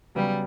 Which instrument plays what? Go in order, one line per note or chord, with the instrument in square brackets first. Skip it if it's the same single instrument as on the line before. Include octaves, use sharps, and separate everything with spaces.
[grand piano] C#3 F#3 B3 [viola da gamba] G3